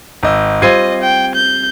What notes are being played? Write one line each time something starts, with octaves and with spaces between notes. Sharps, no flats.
G#1 D#5 E6
G3 C4 F4 D#5 G#6 C7 D#7
G5
G6